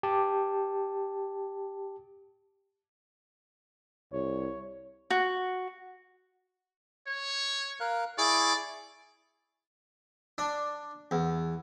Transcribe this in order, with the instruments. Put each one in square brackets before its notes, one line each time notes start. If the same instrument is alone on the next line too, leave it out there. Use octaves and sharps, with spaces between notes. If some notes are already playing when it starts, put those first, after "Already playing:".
[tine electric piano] G4 A5
[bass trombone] C2 [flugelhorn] C#5
[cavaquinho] F#4
[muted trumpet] C#5
[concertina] A#4 F5 F#6
[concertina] E4 G#4 C#6 [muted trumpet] D5
[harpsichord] D4
E2